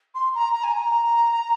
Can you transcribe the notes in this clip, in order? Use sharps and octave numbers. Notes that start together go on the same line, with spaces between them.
C6
A#5
A#5
G#5
A#5